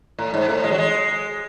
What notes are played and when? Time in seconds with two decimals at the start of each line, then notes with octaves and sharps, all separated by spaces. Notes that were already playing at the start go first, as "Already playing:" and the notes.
0.18 A2
0.34 G#2
0.49 A2
0.64 G#3
0.71 F#3
0.78 G#3